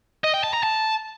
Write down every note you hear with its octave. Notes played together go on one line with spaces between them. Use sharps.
D#5
G5
A5
A#5
A5